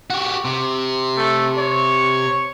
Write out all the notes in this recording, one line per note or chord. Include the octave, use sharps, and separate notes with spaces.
F#4 G4
C3
A3
C#5